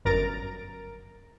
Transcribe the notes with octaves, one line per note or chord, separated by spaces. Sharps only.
G1 F#2 A#4 A#5 A6 D7